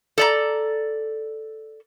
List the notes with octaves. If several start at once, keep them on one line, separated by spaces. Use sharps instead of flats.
A4 D5 A#5